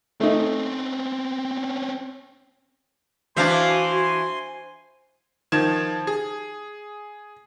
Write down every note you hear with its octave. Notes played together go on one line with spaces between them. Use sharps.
A3 C4 C#4 D#4
E3 D4 F#4 C5 E5 F5 G#5 C6
D#3 F3 G#6 E7
G#4